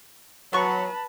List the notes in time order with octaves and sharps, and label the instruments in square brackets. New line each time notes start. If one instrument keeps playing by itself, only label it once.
[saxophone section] F#3 [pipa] B3 C#6 [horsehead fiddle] B4 A5